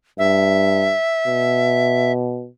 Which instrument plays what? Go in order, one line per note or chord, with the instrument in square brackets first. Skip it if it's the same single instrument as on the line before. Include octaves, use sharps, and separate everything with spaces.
[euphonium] G2 [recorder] E5
[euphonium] B2